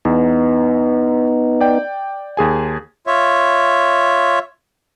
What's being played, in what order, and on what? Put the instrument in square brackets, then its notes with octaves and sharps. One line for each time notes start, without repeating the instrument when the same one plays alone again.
[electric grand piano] E2 [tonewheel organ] B3 D#4
[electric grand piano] D5 G5
D#2 G#4 G#5
[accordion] F4 C#5 E5